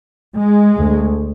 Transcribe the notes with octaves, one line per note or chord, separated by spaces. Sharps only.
G#3
D2